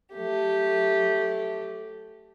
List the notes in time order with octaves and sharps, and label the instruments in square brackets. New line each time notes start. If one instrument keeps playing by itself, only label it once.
[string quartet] F#3 A3 G4